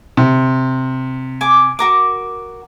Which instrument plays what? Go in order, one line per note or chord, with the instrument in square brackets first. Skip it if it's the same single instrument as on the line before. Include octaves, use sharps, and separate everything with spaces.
[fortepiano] C3
[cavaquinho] G#5 D6
F#4 A#4 D6